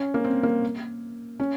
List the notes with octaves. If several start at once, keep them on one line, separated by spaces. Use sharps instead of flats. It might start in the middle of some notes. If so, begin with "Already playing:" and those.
Already playing: C#4
A#3
C4
A#3
C#4